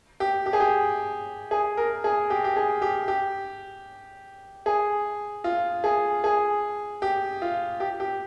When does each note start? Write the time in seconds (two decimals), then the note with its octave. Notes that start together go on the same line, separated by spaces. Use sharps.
0.20 G4
0.46 G4
0.53 G#4
0.60 G4
1.51 G#4
1.77 A#4
2.04 G#4
2.30 G4
2.44 G4
2.56 G#4
2.82 G4
3.08 G4
4.66 G#4
5.44 F4
5.84 G#4
6.24 G#4
7.02 G4
7.42 F4
7.80 G4
8.00 G4